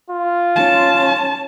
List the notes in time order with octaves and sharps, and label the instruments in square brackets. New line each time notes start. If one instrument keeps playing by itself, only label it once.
[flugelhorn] F4
[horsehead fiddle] C#4 A5